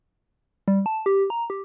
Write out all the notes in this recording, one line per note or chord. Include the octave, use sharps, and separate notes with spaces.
G3
A5
G4
A#5
G4